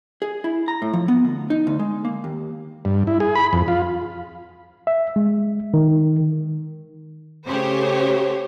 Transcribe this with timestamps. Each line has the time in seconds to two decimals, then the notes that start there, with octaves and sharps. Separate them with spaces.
0.22 G#4
0.44 E4
0.68 A#5
0.82 A2
0.93 F3
1.08 B3
1.25 D2
1.50 D#4
1.67 D2
1.79 G#3
2.05 A#3
2.24 D#2
2.85 G2
3.07 E4
3.20 G#4
3.35 B5
3.53 F2
3.68 F4
4.87 E5
5.16 G#3
5.74 D#3
7.47 C#3 A3 G4 C5 C#5